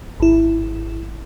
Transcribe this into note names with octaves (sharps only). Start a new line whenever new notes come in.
G#1 E4